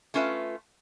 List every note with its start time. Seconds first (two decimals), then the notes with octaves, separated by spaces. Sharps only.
0.14 A3 C#4 F4 B4 E5